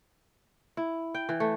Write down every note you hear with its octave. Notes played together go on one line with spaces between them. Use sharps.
E4
G5
E3
A3